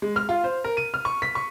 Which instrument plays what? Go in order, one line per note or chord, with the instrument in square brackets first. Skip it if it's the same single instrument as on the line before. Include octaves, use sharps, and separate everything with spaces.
[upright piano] G#3
F6
F4
C5
A#4
D#7
F6
C#6
B6
C#6